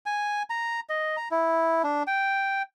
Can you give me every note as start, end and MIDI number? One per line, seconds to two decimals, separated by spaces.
0.06 0.43 80
0.50 0.80 82
0.89 1.16 75
1.17 1.28 82
1.31 1.82 64
1.84 2.03 62
2.07 2.62 79